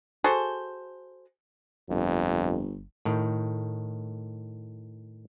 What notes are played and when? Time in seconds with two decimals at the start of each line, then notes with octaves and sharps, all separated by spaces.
0.24 F#4 G#4 A4 C5
1.90 G1 F2
3.05 A2 D#3